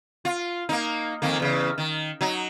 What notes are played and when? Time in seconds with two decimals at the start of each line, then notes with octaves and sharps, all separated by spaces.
0.25 F4
0.69 A#3 D#4
1.22 F2 D#3 A#3
1.40 E2 C#3
1.78 D#3
2.21 F#3 D#4